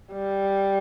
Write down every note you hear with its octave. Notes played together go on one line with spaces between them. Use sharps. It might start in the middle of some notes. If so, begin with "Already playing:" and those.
G3